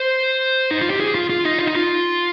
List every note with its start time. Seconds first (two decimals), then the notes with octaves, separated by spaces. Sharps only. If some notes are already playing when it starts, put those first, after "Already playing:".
Already playing: C5
0.71 D#4
0.81 F4
0.90 G4
1.00 G#4
1.15 F4
1.30 F4
1.44 D#4
1.59 F4
1.67 D#4
1.75 F4